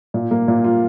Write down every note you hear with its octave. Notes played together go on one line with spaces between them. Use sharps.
A#2
A#3
A#2
F4